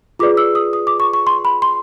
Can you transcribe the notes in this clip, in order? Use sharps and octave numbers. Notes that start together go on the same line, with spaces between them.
F4 G#4 B4 D5 D6
E6
D#6
D#6
D6
C#6
C#6
C6
B5
C6